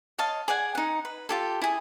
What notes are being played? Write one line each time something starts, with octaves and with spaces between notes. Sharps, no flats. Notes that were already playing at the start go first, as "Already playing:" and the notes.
C#5 D#5 F5 A5
G#4 D5 F#5 G#5
D#4 F#5
B4
F4 G4 A4
E4 G#4